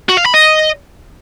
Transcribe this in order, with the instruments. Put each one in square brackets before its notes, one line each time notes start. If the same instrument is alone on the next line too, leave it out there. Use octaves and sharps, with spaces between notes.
[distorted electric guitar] F#4
F5
B5
D#5